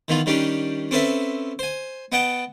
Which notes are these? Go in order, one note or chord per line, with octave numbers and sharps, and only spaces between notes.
D#3 E3 B3 F4
D#3 G3 C#4 D4 G4
C4 C#4 A4 B4 C5 E5
C5 G#5
B3 D#5 F#5 G5 A5